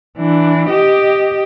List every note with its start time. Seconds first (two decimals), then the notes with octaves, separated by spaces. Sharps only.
0.18 E3 D4
0.70 G4 D#5